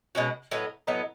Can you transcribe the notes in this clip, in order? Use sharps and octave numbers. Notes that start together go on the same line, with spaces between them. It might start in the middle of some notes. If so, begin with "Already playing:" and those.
B2 G#3 C#4 F#4
A2 F#3 B3 D#4
A2 F#3 B3 D#4